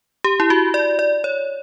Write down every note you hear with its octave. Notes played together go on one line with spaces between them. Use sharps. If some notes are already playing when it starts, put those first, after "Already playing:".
G4
E4
F#4
D5
D5
C#5